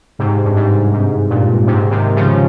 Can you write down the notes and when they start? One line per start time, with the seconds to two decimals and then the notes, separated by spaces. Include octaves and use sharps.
0.19 G#2 C3
0.44 G2
0.56 G#2
0.93 G#2
1.30 G2 A#2
1.66 G#2 C3
1.91 C3 D#3
2.15 C#3 F3